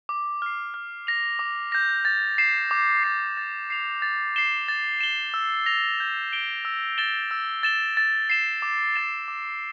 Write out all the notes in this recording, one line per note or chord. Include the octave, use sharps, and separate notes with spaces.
D6
F6 C7
F6
A#6 F7
D6
G6 A#6
A6
C7 E7
D6
A6 C7
A6
C7 F7
A6
C7 E7 G7
A6
E7 G7
E6
A#6 F7
G6
D7 G7
E6
A6 E7 G7
E6
A6 E7 G7
A6
C7 E7 G7
D6
A6 E7 G7
D6